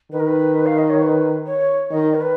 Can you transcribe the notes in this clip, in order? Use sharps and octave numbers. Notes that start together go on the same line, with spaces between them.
D#3 B4
A#4
B4
F5
D#5
C#5
B4
C#5
D#3 D#5
A#4
B4